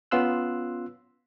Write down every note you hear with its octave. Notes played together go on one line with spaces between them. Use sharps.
B3 C#4 F4 C6 E6 F#6